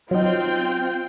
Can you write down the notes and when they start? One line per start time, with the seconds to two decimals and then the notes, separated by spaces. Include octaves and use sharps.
0.11 F#3 C4 D#4 F4 G5